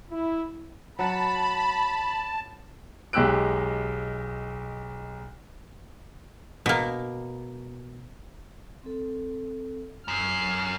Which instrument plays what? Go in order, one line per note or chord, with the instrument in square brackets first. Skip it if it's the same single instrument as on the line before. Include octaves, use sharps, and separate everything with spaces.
[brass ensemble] E4
[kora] F#3 F#4 [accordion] A5 [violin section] B5
[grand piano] B1 G#3 G4 E6 F#6 D7
[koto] B2 A#3
[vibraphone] C4 A4
[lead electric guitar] F#2 [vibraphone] D#6 [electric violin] F6 C7